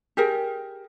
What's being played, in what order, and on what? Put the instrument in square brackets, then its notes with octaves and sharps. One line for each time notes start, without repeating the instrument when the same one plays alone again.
[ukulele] G4 G#4 A#4